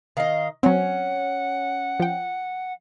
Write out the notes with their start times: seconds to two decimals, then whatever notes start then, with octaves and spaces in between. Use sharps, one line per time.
0.17 D#3 D#5 F5
0.63 F#3 C4 C#4 F#5
2.00 F3 G5